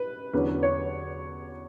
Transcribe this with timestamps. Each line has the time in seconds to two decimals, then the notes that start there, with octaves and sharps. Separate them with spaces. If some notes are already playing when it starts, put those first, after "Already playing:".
Already playing: B4
0.33 E2 D3 F#3 C#4 B4
0.63 C#5